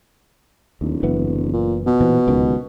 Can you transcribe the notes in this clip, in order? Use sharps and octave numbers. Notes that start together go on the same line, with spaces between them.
D1 D#2
F#1 E3 B3
A#2
B2
A#2 E3 C4
D1 C#2 D#3